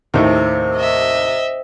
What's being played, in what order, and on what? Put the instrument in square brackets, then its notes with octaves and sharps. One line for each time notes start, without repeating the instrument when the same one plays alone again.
[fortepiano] D#2 A2 D#4 [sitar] C3
[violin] D#5 E5